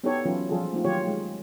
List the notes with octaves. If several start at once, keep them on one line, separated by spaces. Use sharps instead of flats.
B3 D#4 E4 G4 A4 C#5
E3 F#3 C#4 E4 F4 A4
F3 G3 F4 G#4 A4
A3 A#3 C4 D#4 F4
D#3 F#3 F4 G4 C#5
G#3